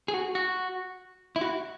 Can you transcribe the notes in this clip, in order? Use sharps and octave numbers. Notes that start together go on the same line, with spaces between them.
G#4
F#4
F#4
E4
F#4